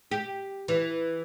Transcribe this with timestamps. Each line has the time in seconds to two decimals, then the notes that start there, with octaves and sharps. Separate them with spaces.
0.11 G4
0.68 E3